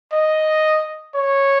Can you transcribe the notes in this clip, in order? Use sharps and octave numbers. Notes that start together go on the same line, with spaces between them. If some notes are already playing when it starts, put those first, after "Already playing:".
D#5
C#5